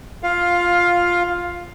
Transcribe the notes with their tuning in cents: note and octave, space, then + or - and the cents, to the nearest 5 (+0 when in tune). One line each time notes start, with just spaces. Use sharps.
F4 +0 F5 +10